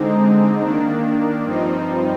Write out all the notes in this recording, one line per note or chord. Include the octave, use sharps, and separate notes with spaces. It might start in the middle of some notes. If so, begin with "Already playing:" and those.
Already playing: D3 G#3 C4 D#4
D#3 A#3 D4
G2 F3 C4 D#4